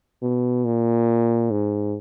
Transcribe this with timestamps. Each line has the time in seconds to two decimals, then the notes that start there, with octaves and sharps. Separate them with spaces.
0.22 B2
0.65 A#2
1.51 G#2